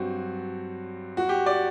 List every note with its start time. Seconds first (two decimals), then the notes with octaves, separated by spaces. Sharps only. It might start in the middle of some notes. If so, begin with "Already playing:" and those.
Already playing: G2 F#3 C4 F#4
1.17 F#4
1.29 G4
1.46 D5